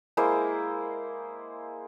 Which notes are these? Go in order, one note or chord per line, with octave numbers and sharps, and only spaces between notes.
G#3 A#3 E4 C5